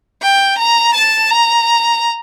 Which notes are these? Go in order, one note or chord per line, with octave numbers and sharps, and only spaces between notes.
G5
A#5
A5
A#5